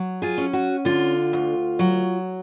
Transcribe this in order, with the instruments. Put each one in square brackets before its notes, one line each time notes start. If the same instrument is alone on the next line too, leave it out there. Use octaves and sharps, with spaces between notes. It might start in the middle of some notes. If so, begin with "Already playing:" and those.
Already playing: [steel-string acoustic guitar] F#3
F4 G#4
C#4
F#4
D3 F4
D2
F#3